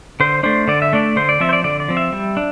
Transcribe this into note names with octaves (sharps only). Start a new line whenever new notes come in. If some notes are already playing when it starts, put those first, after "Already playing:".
D3 C5
A3 D4 C5
D3 D5
E5
A3 D4 D5
D3 C5
D5
F3 C4 E5
C5
D5
D3 D5
D5
F3 C4
E5
G3
D4